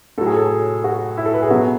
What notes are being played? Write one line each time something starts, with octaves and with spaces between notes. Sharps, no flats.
A2 F#3 A4
G#4
A4
F#4
E4
A4
B4
G#4
B2 F#3 F#4